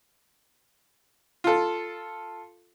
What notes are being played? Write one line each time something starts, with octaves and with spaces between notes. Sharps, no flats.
F4 A4